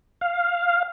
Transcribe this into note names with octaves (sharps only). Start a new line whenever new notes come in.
F5